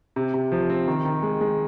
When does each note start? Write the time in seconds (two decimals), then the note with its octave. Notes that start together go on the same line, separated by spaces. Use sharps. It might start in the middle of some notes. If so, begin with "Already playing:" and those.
0.16 C3
0.34 C3
0.52 F3
0.69 C4
0.87 D#3
1.05 D#3
1.23 G#3
1.41 G#3